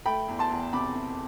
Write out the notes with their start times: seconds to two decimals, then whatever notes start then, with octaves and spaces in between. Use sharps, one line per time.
0.06 A3 G5 B5
0.28 E2
0.39 A5 C6
0.51 E2
0.73 C3 B5 D6
0.95 C3